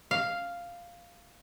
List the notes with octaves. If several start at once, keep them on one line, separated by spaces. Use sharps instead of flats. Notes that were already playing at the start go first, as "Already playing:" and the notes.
F5